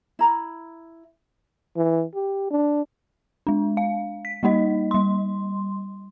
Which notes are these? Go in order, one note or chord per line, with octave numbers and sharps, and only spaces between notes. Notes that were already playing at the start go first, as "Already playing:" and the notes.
E4 A#5 B5
E3
G4
D4
G#3 D4
F5
B6
G3 A#3 D#4 D#5
G3 C6